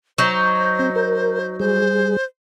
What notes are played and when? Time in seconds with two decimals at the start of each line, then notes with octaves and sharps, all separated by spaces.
0.18 F#3 D#4 C5
0.79 C4
0.96 A#4
1.60 G3 G#4 C5